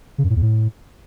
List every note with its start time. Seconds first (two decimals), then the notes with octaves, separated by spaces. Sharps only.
0.18 C#3
0.24 F#2
0.30 A2
0.36 E2
0.42 A2